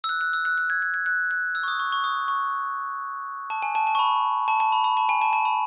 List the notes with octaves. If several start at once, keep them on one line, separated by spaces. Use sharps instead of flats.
E6
F#6
F#6
E6
F#6
F#6
G#6
G#6
G#6
F#6
F#6
E6
C#6
D#6
C#6
C#6
D#6
C#6
A5
G#5
A5
A5
C#6
B5
A5
A5
B5
B5
A5
G#5
A5
A5
B5